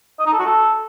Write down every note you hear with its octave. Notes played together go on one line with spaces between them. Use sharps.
D#5
D#4
A4
F#4
A4